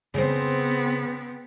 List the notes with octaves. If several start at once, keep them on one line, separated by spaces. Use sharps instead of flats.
C#3 B3 C4 C5